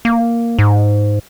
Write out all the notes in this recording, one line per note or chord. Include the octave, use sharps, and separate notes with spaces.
A#3
G#2